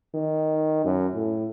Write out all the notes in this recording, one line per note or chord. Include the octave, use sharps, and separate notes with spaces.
D#3
F#2
A2